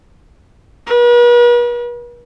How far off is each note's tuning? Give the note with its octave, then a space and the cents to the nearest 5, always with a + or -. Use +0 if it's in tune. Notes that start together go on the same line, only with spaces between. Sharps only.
B4 -45